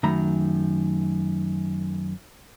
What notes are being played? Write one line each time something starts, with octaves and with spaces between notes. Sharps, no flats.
F#2 D#3 A3 A#5 B5